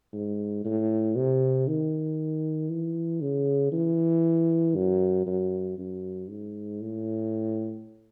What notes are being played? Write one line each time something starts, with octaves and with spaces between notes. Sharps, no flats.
G#2
A2
C3
D#3
E3
C#3
E3
F#2
F#2
F#2
G#2
A2